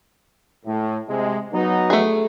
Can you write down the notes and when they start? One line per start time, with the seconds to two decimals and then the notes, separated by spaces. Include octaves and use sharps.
0.66 A2
1.08 C3 G#3
1.53 F#3 B3 D#4
1.90 A3 G#4